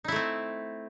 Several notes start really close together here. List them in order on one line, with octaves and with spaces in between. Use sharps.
D#4 E4 A3 C4